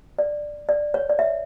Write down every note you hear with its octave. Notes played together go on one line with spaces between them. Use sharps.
D5
D5
C#5
D5
E5